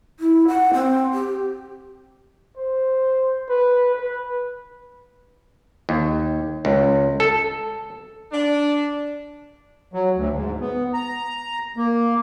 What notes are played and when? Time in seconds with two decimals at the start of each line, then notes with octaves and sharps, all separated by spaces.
0.20 E4
0.48 F#5
0.74 C4
1.13 G4
2.57 C5
3.49 B4
3.94 B4
5.89 D#2
6.65 C#2
7.20 A4
8.32 D4
9.94 F#3
10.16 D2
10.34 G#2
10.60 B3
10.94 A#5
11.77 A#3